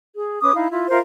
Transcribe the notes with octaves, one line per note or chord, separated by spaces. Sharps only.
G#4
C#4 B4 D6 D#6
D#4 E4 F5
E4 F4
F4 A#4 C5 E5